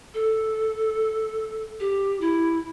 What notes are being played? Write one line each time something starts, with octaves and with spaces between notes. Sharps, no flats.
A4
G4
E4